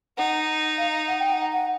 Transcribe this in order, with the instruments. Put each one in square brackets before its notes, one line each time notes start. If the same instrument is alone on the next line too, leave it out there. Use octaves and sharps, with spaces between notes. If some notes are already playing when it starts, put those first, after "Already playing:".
[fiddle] D#4 [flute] F#5
[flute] F5
F#5
G5
F#5
F#5